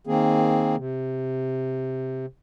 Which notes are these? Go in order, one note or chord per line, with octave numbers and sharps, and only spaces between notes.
D#3 A#3 C4 G#4
C3